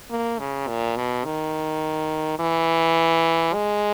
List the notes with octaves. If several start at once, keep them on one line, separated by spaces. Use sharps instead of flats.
A#3
C#3
A#2
B2
D#3
E3
G#3